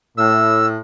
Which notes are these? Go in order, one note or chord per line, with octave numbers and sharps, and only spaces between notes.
A2 E6